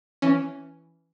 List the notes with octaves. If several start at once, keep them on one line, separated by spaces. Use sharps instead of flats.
E3 C#4